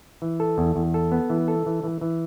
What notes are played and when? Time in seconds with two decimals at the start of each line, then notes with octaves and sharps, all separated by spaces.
0.22 E3
0.40 A4
0.58 E2
0.76 E2
0.94 A4
1.12 B3
1.30 E3
1.48 A4
1.66 E3
1.84 E3
2.01 E3